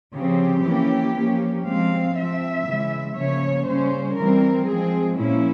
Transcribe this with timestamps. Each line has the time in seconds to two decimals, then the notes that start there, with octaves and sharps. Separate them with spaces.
0.14 C#3 F3 C4 G4
0.65 E3 A#3 C#4
1.15 F3 A#3 C#4
1.65 F3 G#3 C4 F5
2.16 F3 C4 E5
2.66 C#3 E3 G#3
3.16 C#3 F3 A#3 C#4 C#5
3.67 C#3 G3 C#4 C5
4.17 E3 G3 C4 A#4
4.67 F3 G#3 C4 G#4
5.18 A#2 F3 A#3 C#4 E4